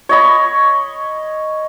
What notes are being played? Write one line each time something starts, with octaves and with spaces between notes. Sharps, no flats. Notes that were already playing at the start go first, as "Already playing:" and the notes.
C#5 D#5 B5